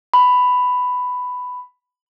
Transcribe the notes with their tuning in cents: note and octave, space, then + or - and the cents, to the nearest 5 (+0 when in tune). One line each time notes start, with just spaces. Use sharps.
B5 +10